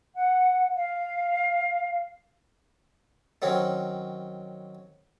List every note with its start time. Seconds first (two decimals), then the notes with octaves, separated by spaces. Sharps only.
0.15 F#5
0.75 F5
3.42 D#3 F#3 C4 C#4